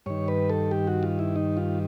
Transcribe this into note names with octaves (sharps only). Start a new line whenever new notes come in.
G2 D#3 C#5
B4
A4
G4
F#4
F4
E4
D#4
F4